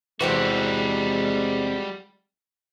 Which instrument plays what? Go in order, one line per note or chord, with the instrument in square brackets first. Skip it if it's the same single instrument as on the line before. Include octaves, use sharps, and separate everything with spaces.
[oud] E2 C3 E3 [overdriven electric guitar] G3 F#4 [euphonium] G#3